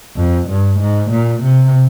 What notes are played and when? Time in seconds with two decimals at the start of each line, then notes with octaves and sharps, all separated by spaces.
0.17 F2
0.49 G2
0.79 G#2
1.11 A#2
1.42 C3